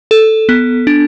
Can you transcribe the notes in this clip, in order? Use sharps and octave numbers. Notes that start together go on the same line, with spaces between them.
A4
B3
D4